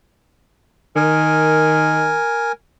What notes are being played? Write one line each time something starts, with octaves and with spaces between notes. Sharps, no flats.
D#3 A#4 G#5